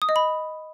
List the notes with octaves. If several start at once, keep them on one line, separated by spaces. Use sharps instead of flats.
D#6
D#5
B5